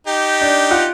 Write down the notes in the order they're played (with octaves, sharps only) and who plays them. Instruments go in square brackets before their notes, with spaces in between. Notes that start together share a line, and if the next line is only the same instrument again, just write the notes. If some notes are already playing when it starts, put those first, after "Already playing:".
[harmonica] D#4 G4
[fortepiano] D4
F4 F#5